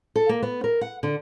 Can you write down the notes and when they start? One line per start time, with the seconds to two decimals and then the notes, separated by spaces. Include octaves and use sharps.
0.16 A4
0.29 A#3
0.43 B3
0.64 A#4
0.81 F#5
1.03 D3